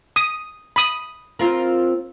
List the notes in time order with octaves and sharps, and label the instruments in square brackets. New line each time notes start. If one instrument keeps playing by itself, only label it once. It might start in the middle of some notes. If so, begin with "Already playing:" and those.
[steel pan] D#6
B5 D#6
[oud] C4 F4 A#4